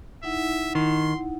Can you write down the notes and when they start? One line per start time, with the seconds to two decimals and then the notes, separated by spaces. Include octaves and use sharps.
0.23 D#4 E4 E5 F#5
0.75 D#3 C6